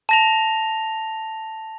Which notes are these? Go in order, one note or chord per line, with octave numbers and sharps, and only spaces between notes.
A5 A#6 F7